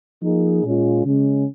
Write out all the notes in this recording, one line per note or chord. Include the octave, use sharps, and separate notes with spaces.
F3 A#3 D#4 G#4
A#2 G#3 C#4 F4
C#3 G#3 C#4